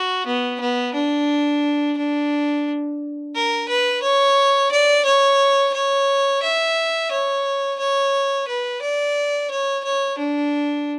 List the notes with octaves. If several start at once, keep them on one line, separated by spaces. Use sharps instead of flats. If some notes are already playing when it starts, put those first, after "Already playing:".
Already playing: F#4
B3
B3
D4
D4
A#4
B4
C#5
D5
C#5
C#5
E5
C#5
C#5
B4
D5
C#5
C#5
D4